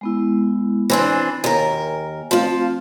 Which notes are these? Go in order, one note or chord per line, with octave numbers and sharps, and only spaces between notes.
G#3 B3 E4
E3 C4 D4 G#5
D#2 A#4
F3 A3 C4 F4 F5